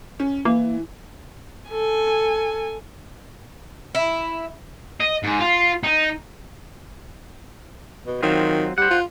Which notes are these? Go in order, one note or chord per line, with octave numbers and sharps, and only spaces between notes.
C#4
E3 A#3 E4
A4 G#5
E4
D#5
G#2
F4
D#4
B2
D#3 F#3 C4 F4
G3 C5 F#5
F4